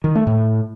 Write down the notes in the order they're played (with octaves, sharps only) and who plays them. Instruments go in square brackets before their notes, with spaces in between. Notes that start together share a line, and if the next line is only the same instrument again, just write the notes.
[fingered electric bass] D#3
A3
A2